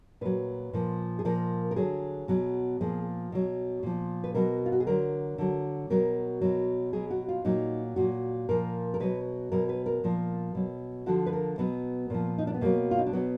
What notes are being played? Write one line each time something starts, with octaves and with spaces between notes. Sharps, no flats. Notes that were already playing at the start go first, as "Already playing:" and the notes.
A#2 F#3 B4
A#2 F3
G#4
A#2 F3 A#4
A#4
D3 F#3 G#4
B2 F#3
A#2 F3 G#4
B2 F#3
A#2 F3
B4
B2 F#3 A#4
F4
F#4
G#4
D3 F#3 A#4
D3 F#3
B2 F#3 A#4
B2 F#3
B2 F#3 G#4
F#4
F4
A#2 F#3 D#4
A#2 F#3 F#4
A#2 F3 A#4
A#4
B2 F#3 B4
B2 F#3 A#4
B4
A#4
A#2 F3
B2 F#3
D3 F3 F#4
B4
A#4
B2 F#3 B3
A#2 F3
D#4
D4
B3
B2 F#3 A#3
F4
D#4
D4
B2 F#3 B3